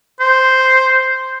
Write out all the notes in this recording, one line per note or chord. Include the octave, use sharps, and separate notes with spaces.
C5